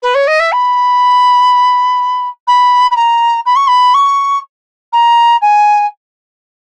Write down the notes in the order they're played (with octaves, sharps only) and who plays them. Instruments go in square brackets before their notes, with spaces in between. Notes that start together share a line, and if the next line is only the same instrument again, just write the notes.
[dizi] B4
C#5
D#5
E5
B5
B5
B5
A#5
B5
C#6
B5
C#6
A#5
G#5